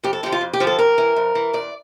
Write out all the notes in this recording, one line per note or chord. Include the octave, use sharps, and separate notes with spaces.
F2 G4
A4
D3 F3 G4
F4
F2
G4
D3 F3
A4
F2 A#4
E3
F2
E3
E2 D5